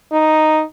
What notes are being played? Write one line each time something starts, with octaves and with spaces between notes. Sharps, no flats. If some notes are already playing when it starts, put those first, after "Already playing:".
D#4